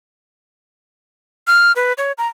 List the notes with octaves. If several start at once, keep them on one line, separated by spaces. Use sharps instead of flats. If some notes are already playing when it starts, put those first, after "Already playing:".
F6
B4
C#5
A#5